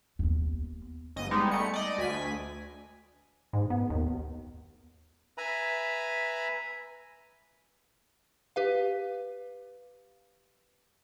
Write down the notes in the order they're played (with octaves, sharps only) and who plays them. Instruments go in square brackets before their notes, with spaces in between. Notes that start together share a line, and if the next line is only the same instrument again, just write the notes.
[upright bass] D#2 B3
[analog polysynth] G1 D#5 D#7
G3 G#3 B3 D#4
A3 C#7
D5 D#5
D2 G#5 B6
[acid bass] G#2
B3
D#2
[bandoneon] B4 E5 G#5 A#5 B5
[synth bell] G4 B4 F5